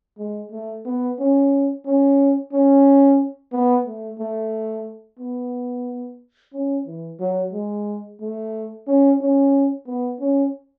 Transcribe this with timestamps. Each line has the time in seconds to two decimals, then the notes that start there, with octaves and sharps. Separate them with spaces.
0.18 G#3
0.52 A3
0.86 B3
1.19 C#4
1.86 C#4
2.52 C#4
3.52 B3
3.86 A3
4.19 A3
5.19 B3
6.53 C#4
6.87 E3
7.20 F#3
7.53 G#3
8.20 A3
8.87 C#4
9.21 C#4
9.87 B3
10.20 C#4